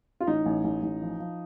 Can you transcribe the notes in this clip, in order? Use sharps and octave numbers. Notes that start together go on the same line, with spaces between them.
F4
A1 D#4
A1
A1
A1
F3
F3